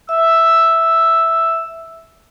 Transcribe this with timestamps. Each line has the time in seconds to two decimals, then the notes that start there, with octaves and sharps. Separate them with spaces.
0.09 E5 E6